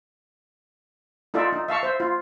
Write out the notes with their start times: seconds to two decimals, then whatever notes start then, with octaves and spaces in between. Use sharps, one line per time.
1.34 D#4 F4 A4 D5 E5
1.52 D#4
1.68 E5 F5 A5 C#6
1.83 C5 E5
2.00 F4